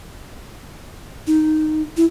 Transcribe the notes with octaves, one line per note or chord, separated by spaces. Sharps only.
D#4
E4